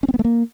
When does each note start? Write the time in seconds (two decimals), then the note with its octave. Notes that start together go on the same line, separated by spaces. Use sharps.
0.03 C#4
0.08 C4
0.14 B3
0.19 A3
0.25 A#3